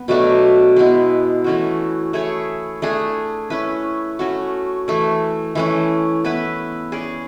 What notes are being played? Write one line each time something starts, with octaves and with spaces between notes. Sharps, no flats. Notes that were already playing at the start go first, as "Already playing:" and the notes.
Already playing: B3
B2 F#3 A3 D4
G#3 B3 E4
E3 A3 C#4 F#4
A3 E4 G#4 C#5
A3 D4 G#4
C#4 E4 B4
A3 C#4 F#4
E3 A3 E4
E3 A3 C#4
B3 E4 B4
C#4 G#4 D5